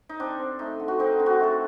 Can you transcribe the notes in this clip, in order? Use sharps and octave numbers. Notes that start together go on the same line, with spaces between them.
D#4
C4 D4
C4
A3 D#4
D3
F#4
C4 D#4
D3
F#4
A3 A4